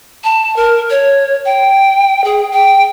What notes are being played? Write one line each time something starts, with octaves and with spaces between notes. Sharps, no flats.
A5
A#4
C#5
G5
G#4
G5